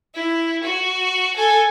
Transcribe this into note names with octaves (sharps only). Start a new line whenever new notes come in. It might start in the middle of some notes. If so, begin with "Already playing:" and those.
E4
F#4
A4 G#5